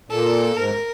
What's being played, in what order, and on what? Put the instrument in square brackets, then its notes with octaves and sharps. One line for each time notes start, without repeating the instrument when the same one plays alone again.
[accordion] A#2 [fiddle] A4
[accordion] G#2 [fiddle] A#4